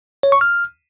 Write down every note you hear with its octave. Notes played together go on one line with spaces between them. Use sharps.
C#5
C#6
F6